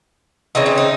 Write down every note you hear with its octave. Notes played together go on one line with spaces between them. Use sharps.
C#3 E3 C4 D#4
C#4
D#4